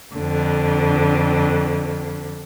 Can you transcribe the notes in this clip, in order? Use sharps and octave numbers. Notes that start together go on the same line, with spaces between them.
F2 D3